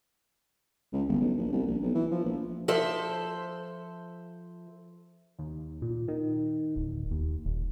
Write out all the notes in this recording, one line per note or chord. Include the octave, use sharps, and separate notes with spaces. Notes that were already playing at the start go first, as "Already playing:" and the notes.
C#2
G1
B1
A#1
C2
A#1
B1
E3
F3
A#1
F3 A4 C5 E5
D#2
A#2
D#3
D1
D#2
D#1